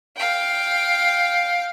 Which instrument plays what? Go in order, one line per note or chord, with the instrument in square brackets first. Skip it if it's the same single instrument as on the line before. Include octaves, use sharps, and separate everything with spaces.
[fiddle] F5 G5